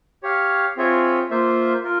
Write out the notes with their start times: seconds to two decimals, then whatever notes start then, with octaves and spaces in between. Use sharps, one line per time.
0.23 G4 C#5 F5
0.77 C4 F4 G#4 C#5 E5
1.30 A#3 F4 C5 E5
1.83 F4 A#4